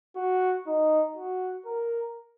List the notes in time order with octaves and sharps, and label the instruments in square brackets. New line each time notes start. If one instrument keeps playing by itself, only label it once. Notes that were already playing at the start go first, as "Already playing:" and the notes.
[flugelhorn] F#4
D#4
F#4
A#4